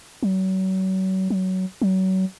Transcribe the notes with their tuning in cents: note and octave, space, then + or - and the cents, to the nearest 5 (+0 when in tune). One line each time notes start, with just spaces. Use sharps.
F#3 +35
F#3 +15
F#3 +30